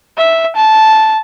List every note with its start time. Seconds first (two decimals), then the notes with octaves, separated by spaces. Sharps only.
0.18 E5
0.56 A5